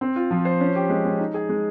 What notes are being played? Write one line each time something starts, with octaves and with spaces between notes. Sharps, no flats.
C4
F4
F3
C5
C#4
G4
G#3
G#3
D#4
G#4
G#3